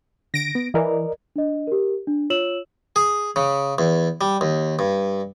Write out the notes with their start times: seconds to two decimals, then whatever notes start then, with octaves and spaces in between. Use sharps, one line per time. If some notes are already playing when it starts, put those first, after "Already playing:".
0.34 D3 A#6 D7
0.55 B3
0.74 E3 A#4 D5 D#5
1.36 D4 D#5
1.67 G4 A#4
2.07 D4
2.30 F4 C#5 E6 E7 F#7
2.96 G#4
3.36 C#3
3.78 E2
4.21 G3
4.41 D#2
4.79 G2